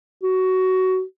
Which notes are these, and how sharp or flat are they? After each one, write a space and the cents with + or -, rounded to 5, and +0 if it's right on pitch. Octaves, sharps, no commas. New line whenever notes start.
F#4 +15